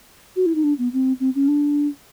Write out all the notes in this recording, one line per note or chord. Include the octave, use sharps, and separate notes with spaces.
F#4
E4
D#4
D4
B3
C4
C4
C#4
D4